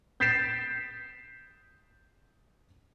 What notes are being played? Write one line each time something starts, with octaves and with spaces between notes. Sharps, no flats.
G6 A6 B6 C7 D7 E7